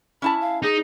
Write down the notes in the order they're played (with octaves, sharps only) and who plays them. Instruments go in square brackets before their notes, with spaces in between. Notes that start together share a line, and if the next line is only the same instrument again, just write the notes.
[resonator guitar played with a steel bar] C#4 E4 A5 [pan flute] B5
[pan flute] F5
[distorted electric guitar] D#4 [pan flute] G#4